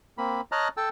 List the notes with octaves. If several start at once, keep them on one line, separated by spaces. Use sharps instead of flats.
A#3 C4 B5
C#5 D#5 A5 A#5 F6 F#6
A4 G5 A5 E6